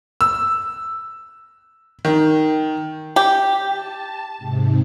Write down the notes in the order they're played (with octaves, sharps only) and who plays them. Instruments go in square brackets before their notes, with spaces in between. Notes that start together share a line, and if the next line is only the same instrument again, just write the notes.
[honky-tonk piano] E6
D#3
[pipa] G4
[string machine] A5
G#2 C3